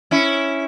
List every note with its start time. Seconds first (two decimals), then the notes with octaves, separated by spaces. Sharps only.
0.11 C#4 E4